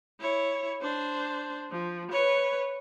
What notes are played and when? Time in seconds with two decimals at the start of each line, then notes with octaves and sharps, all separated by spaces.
0.20 E4 C#5
0.81 D4 C5
1.71 F3
2.11 B4 C#5